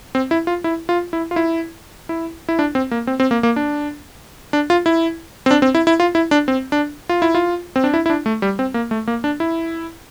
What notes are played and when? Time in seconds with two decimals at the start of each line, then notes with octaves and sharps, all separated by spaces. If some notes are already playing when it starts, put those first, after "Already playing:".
0.15 C4
0.31 E4
0.47 F4
0.64 E4
0.89 F4
1.13 E4
1.31 F4
1.36 E4
2.09 E4
2.49 E4
2.59 D4
2.75 C4
2.91 A#3
3.07 C4
3.20 C4
3.31 A#3
3.43 A#3
3.56 D4
4.53 D4
4.70 F4
4.86 E4
5.46 C4
5.51 D4
5.62 C4
5.75 E4
5.87 E4
6.00 F4
6.15 E4
6.31 D4
6.48 C4
6.72 D4
7.09 F4
7.22 E4
7.35 F4
7.76 C4
7.84 D4
7.94 E4
8.06 E4
8.10 D4
8.26 A3
8.42 G3
8.59 C4
8.74 A#3
8.91 A3
9.07 A#3
9.24 D4
9.40 E4